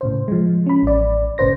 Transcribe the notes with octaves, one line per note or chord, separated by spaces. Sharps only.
A2 C#3 C5
F3 G#3
C#4 B5
A1 D5
G1 A2 C#3 B4 C5 A#6